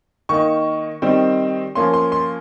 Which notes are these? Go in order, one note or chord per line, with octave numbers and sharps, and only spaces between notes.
D#3 A#3 D#4 C#6
D#3 G3 C4 D#4
F3 A#3 C#4 C6
C6
C6